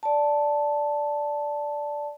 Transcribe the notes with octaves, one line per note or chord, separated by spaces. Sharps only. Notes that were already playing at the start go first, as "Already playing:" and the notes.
D5 A5